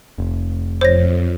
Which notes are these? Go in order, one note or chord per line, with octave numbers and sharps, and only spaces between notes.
F1
F2 C5 C#5 A#6